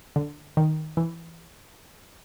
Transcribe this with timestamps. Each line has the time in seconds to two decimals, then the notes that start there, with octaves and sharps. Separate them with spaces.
0.16 D3
0.57 D#3
0.97 E3